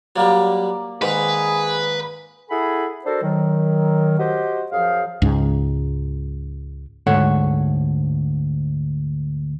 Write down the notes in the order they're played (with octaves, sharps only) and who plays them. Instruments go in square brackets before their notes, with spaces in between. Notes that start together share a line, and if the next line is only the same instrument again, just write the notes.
[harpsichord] F#3 G3 [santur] A#3 D5
[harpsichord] G#2 D#3 [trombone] G#4 [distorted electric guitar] B4
[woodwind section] E4 G#4 A4 F#5 G#5 B5
D4 F#4 A4 A#4 C5
D#3 F#3
F#4 G4 C5 D#5
F#2 F3 G#4 F5
[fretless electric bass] C#2 G#2
[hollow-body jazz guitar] D2 G#2 A4 C#5 F#5